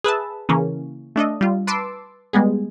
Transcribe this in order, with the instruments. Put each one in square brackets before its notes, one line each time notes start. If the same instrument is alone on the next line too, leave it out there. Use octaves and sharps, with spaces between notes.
[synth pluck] G#4 B4 E5 A5
C#3 E3 A#3 C#4
A3 D4 A4 D#5
G3 F4
B4 A5 C6 D6 E6
G3 G#3 B3 G#4